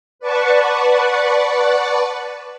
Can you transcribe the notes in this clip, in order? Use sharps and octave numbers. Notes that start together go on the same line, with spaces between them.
B4 D5 F#5 A5 C#6